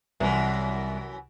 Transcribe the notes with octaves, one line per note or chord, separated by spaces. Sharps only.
C2 F#2 E3